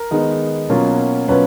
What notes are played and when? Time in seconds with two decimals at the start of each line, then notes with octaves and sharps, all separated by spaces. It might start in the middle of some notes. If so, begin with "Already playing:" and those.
Already playing: A#4
0.11 D#3 G#3 B3 D#4
0.69 B2 F#3 A#3 C#4 F4
1.28 B2 F#3 A#3 C#4 F4 B4